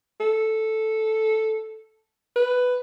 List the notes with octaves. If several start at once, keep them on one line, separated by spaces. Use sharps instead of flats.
A4
B4